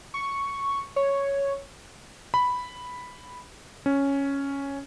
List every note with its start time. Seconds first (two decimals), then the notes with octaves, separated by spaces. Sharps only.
0.14 C#6
0.96 C#5
2.34 B5
3.86 C#4